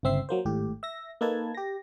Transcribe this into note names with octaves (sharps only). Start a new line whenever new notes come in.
G1 C#2 C4 E5 C7
F#3 A#3 C5
G#1 A2 G4
E5 A#6
A#3 D#4 A4 B4 A5 G#6
G4 A#6